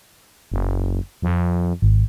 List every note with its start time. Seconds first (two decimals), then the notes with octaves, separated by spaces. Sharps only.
0.52 F#1
1.22 F2
1.82 G#1